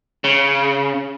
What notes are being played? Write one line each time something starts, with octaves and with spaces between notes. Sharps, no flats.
C#3